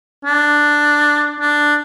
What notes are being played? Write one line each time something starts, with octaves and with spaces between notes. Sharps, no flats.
D4
D4